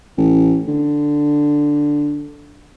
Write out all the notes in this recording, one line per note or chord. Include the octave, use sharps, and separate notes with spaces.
A1
D3